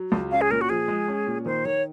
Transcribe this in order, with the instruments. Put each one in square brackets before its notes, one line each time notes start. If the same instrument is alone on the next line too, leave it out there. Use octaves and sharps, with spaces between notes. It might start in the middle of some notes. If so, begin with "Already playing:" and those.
Already playing: [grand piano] F#3
C#2
[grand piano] C#4 [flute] F5
[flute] G#4
[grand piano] A#2 [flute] A#4
[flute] F#4
[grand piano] F3 [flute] G#4
[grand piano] G#3
C#4
A#2
[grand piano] D#3 [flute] C5
[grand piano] D#3 [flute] C#5